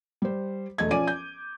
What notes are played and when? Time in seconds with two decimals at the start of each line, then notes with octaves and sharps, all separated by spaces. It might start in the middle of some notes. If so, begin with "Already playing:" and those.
0.22 G3 C5
0.78 E1 A3 A4 D#5 G#6
0.90 F3 C#4 D5 G#5 D6 D#7
1.07 G6